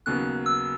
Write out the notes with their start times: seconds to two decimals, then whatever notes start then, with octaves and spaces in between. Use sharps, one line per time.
0.06 D#2 C#3 F#3 B3 F#6
0.46 E6